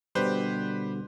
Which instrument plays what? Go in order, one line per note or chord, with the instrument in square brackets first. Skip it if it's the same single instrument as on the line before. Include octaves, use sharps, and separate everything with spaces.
[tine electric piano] B2 D3 G3 [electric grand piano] G4 B4 C5